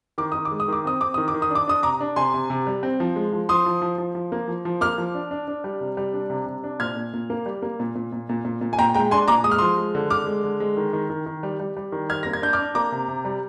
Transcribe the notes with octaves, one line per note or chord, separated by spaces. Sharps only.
D#3 D6
D#3 D#6
D6
G#3
D#6
D#3 D6
C4 D#6
C4 D6
D#3 D#6
D6
D#3
D#6
D4 D6
D4 D#6
C3 A#5 D6
D4
C3 G#5 C6
C3
C3
G3
C4
F3
G#3
F3
F3 C6 D#6
F3
F3
F3
F3
A#3
F3
F3
A#3 D6 F6
F3
D4
D4
D4
G3
C3
G3
D4
C3
C3
D4
A#2 F6 G#6
A#2
A#2
A#3
G3
A#3
A#2
A#2
A#2
A#2
A#2
A#2
G#5
A#2 G5 A#5
G#3 G5 A#5
D4 G#5 C6
A#2 A#5 D6
G#3 D#6
F6
F3 C6 D#6
G#3
D3
D3 D6 F6
G#3
D3
G#3
D#3
D#3
D#3
D#3
G3
G3
G3
D#3
G3 F6 G#6
A#3 A#6
G#6
D4 G6
D6 F6
D4
A#3 A#5 D6
C3
C3
G3